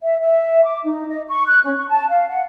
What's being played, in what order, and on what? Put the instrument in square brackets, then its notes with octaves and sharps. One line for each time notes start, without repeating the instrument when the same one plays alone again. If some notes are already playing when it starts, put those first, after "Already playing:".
[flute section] E5
E5
D6
D#4
D#5
C#6
F#6
C#4
C#6
A5
F5
F#5